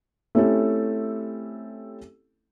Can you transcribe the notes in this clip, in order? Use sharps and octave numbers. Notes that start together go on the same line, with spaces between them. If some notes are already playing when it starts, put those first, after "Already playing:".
A3 C4 C#4 E4 G4 A4